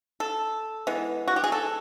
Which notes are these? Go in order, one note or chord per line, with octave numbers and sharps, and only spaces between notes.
A4
E3 G#3 B3
F#4
G4
G#4
A4